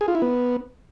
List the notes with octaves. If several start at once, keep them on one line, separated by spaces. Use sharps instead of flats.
G#4
F4
E4
B3